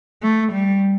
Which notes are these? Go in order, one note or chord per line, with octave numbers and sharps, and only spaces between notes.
A3
G3